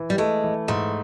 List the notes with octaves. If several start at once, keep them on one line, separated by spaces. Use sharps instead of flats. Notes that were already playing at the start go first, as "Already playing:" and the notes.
Already playing: E3
G3
G#3 A3
E3
G#2 A3